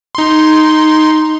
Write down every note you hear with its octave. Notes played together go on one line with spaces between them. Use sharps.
D#4 C6